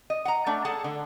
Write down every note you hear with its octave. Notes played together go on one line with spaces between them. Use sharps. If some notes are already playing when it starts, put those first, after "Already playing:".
D#5
F#5 A#5
A3 D4
G#4 A4 F#5 A5
D3